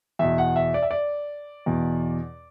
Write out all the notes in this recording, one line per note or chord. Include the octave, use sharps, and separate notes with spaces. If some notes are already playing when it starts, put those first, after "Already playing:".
E2 B2 E5
F#5
E5
D5
E5
D5
E2 B2